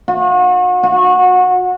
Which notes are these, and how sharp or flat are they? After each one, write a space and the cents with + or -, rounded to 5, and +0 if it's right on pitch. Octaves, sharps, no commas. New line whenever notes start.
F#4 -40
F#4 -25